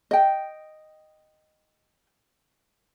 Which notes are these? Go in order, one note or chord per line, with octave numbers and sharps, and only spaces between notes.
D#5 G5